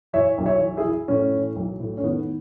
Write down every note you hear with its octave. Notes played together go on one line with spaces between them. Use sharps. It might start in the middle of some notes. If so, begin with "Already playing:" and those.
E3 C#5 E5
B1
C#5 E5
E3
E4 G#4
E3
A2 C#4
E3
B1
A2
C#4
D#3 B3